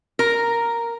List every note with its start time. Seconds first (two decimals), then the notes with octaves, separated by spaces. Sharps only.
0.19 A#4